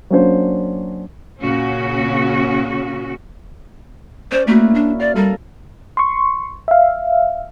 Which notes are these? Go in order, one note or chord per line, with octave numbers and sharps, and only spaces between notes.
F#3 A#3 C#4 D4 C5
A#2 C#3 C#4 F#4
C#4 C5 D5
A3 A#3 E4 F#4
D4
D5 F5
G3 A4 A#4
C6 C#6
E5 F5